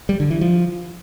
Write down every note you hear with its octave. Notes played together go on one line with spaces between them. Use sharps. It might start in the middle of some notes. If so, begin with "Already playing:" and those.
G3
D3
E3
F3